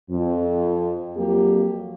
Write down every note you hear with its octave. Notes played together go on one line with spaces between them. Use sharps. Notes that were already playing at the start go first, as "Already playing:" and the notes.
F2
F2 F#3 A#3 G4